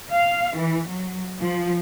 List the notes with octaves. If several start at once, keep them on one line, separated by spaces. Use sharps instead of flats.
F5
E3
F#3
F3